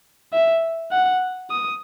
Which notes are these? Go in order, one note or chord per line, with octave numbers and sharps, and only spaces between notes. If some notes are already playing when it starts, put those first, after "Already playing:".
E5
F#5
D#6